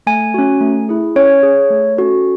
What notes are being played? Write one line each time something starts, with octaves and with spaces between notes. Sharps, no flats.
A3 G#5
C#4 F#4
A3
E4 G#4
C#4 C#5
G#4
A3
C#4 F#4 A4